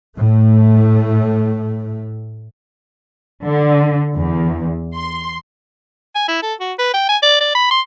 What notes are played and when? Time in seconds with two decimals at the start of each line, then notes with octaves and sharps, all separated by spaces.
0.16 A2 A3
3.45 D3
4.17 E2
4.95 C6
6.15 G#5
6.28 E4
6.43 A4
6.60 F#4
6.79 B4
6.94 G5
7.09 G#5
7.23 D5
7.41 D5
7.55 B5
7.71 C6